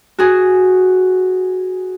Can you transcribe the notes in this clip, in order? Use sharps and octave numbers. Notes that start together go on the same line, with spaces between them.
F#4 G#4